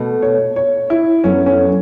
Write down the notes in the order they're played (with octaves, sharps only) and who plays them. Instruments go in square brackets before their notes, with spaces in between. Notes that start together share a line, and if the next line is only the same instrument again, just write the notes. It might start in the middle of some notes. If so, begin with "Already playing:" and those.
Already playing: [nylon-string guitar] B2 A3 F#4 A4
[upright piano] C#5
C#5
E4
[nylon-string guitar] F#2 F#3 B3 A4 C#5 [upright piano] C#4
[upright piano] C#4